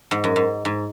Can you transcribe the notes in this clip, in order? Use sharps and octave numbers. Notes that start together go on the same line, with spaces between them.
G#2
F#2
G#2
G#2